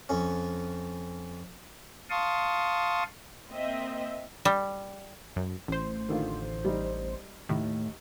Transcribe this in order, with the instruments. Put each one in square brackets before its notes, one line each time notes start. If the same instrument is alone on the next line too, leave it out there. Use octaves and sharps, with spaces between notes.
[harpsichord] F2 C#4
[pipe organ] F5 A5 C6 C#6 D#6
[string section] A#3 C4 D#5 E5
[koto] G3
[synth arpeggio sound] F#2
A1 C5
[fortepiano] D3 D#3 F4
G3 D#4
[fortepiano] D#2 [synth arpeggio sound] A2